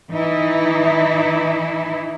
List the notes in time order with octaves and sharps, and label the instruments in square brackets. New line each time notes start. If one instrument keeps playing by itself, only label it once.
[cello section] E3 D#4 E4